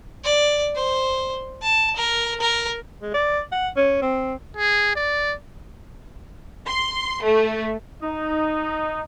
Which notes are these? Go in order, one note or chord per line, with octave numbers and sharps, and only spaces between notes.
D5
C5
A5
A#4
A#4
G#3
D5
F#5
C#4
C4
G#4
D5
C6
A3
D#4